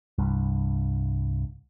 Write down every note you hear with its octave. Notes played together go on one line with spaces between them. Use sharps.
C2 G2